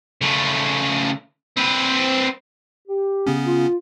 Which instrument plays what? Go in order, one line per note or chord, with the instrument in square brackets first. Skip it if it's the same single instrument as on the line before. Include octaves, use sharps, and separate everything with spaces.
[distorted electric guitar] C#3 A3
C4 B4
[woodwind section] G4
[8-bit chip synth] C#3 B3 C#4
[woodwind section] F4